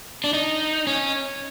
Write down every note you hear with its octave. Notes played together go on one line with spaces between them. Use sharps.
D4
D#4
C#4